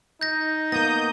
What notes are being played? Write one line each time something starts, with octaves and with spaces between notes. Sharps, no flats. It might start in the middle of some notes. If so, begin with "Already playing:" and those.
D#4 G6 A#6
A#3 B3 D#6 G6 A#6